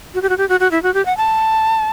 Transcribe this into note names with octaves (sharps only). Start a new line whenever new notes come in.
F#4
G4
F#4
G4
F#4
F#4
E4
F#4
G4
F#5
A5